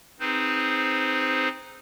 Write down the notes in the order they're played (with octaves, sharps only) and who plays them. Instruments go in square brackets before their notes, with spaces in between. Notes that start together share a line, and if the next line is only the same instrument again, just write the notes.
[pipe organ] C4 D#4 G#4 B4 C5